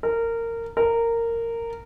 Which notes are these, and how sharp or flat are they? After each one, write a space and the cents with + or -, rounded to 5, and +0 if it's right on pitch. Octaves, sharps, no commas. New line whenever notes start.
A#4 -20
A#4 -15